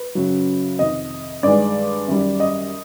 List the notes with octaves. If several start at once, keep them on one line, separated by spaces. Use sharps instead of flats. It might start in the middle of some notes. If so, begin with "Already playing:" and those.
Already playing: B4
F#2 C#3 F#3
F2 C3 D#3 D#5
G2 D#3 G#3 D5
F#2 D#3 G3
D#5